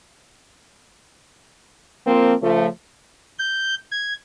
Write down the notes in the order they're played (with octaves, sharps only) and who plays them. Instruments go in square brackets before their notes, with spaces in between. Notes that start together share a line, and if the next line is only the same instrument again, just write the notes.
[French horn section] F3 A#3 C4
C#3 F3 A3
[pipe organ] G6
G#6